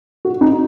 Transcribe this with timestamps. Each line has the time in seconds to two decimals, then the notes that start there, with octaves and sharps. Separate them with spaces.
0.25 F#4
0.41 D#4